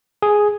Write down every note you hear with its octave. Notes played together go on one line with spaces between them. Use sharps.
G#4